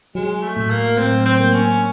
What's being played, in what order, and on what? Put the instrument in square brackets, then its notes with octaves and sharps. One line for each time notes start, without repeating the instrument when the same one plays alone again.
[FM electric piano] F#3 [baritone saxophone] G#3
[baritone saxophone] A3
[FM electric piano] A2
[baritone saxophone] A#3
[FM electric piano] A2 [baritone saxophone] C4
[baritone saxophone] C4
[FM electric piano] A#3
[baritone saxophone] C#4